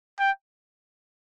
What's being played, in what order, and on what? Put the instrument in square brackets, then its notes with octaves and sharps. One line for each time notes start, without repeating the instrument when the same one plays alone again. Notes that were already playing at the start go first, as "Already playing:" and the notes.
[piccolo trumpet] G5